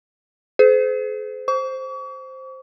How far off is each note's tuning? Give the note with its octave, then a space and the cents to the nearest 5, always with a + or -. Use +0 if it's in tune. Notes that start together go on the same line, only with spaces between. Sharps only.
G#4 +45 C5 -35
C5 +0 C#6 +45